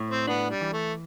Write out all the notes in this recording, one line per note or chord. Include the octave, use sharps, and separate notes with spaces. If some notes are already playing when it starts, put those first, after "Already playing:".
Already playing: A2
C4
B3 D4
G3
E3
A3